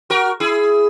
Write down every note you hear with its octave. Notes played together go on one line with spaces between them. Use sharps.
F#4 A#4
E4 G#4